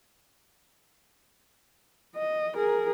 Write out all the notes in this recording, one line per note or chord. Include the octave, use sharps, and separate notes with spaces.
D#5
G#4 A#4